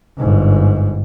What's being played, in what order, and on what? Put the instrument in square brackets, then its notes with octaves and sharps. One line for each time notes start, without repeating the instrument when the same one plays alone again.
[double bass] G1 G#2